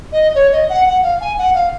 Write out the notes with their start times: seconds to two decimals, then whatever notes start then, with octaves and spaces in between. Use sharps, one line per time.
0.12 D#5
0.35 C#5
0.53 D#5
0.70 F#5
0.86 F#5
1.03 F5
1.21 G#5
1.38 F#5
1.54 F5